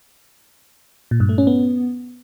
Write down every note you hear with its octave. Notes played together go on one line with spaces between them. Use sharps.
A#2
G2
A3
C#4
B3